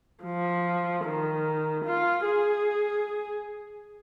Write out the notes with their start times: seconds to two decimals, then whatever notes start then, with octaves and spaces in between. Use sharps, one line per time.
0.24 F3
1.04 D#3
1.84 F4
2.25 G#4